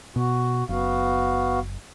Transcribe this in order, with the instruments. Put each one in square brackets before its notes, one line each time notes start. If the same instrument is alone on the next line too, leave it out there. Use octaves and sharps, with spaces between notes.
[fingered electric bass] B2 [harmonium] F#4
[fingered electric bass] F#1 [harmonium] B3 F#4 F5